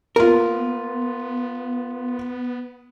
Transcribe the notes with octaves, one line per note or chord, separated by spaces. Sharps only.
A#3 B3 F4 A#4